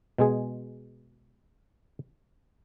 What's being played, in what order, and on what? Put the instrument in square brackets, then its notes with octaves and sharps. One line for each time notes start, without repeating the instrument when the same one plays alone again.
[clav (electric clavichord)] B2 G#3 G#4